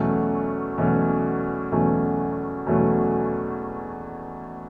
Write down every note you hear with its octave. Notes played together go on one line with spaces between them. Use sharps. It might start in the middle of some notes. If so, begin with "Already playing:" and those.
Already playing: E2 B2 F#3 A3 C#4
E2 B2 F#3 A3 C#4
E2 B2 F#3 A3 C#4
E2 B2 F#3 A3 C#4